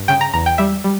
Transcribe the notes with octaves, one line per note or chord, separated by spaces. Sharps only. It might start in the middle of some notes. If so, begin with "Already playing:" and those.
Already playing: G2
C#3 G5
A#5
E2 A#5
G5
G3 E5
G3